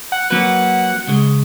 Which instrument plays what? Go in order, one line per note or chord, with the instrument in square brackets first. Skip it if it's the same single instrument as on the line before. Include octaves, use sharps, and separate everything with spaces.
[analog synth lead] F#5
[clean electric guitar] F#3 A#3 C#4 F#4 B4 [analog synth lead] F#5
[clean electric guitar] C#2 C#3 G#3